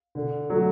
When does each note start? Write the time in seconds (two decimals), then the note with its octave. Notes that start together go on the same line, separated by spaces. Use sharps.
0.15 D3
0.50 F#3 A3